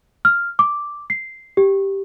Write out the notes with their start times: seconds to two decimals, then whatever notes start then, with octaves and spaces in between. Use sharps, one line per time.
0.25 F6
0.59 D6
1.10 C7
1.57 G4